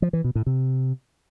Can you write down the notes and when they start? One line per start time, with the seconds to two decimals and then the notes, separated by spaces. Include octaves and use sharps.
0.02 F3
0.13 E3
0.24 B2
0.35 A2
0.46 C3